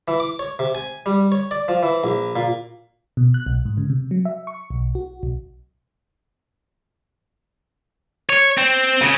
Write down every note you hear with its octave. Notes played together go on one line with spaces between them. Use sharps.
E3
D6
C#5
C3
G#5
G3
C#5
D5
F3
E3
A#1
A#2
B2
F#6
B1
G#2
C#3
C3
F#3
E5
C#6
B1
F#4
B1
C#5
C4
C#3